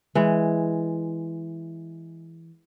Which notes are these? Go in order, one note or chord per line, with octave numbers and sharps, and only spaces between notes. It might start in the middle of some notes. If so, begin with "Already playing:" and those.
E3 G#3